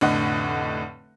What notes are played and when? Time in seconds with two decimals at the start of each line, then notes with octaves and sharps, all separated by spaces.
0.01 F1 A2 D3 D#5 F#5